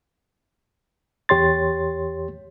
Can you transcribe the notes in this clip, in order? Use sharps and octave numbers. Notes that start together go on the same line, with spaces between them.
E2 G4 C#5 C6 A6